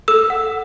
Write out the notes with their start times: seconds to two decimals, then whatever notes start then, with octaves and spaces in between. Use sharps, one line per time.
0.08 A4 E6
0.30 F#5